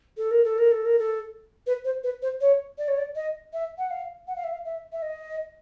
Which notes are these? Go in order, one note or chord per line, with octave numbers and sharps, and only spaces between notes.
A4
A#4
A4
A#4
A4
A#4
A4
B4
C5
B4
C5
C#5
D5
C#5
D5
D#5
E5
F#5
F5
F#5
F5
E5
F5
E5
E5
D#5